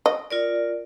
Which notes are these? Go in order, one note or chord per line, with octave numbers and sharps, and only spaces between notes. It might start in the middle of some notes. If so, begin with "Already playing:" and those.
D#5
F4 A#4 D5